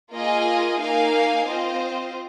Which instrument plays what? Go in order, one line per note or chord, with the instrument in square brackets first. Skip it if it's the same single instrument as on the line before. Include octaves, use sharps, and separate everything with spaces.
[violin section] A#3 F4 G#4 D#5 G#5
A#3 D#4 A#4 F5 G#5
C4 F4 C5 D#5